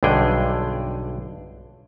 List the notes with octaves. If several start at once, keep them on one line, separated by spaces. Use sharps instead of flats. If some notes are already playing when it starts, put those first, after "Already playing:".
B1 G2 D3 G#4 G5